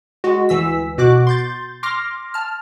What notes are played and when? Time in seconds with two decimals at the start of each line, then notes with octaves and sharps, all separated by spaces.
0.24 G#3 F#4
0.49 D2 E3 E6 B6
0.98 B2 F#4 D6 F#6
1.27 C6 G6 A6
1.83 C6 D6 F6 A#6
2.34 A5 F6